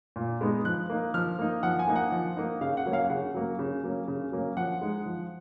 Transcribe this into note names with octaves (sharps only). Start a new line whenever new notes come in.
A#2
G#3 B3 D#4
F3 F#6
A#3 D#4
F3 F6
A#3 D#4
F3 F#5
G#5
A#3 D#4
F#5
F3
A#3 D#4
C#3 F5
F#5
F#3 A#3 C#4
F5
C#3 F#5
F#3 A#3 C#4
C#3
F#3 A#3 C#4
C#3
F#3 A#3 C#4
F3 F#5
G#3 D#4
F3